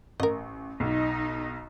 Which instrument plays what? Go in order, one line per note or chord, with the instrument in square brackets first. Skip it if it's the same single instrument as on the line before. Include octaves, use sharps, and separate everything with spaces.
[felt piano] A1 [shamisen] A#4 D#5
[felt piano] B1 [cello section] D#4